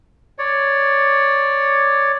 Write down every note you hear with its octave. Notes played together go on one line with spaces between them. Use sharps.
C#5 D5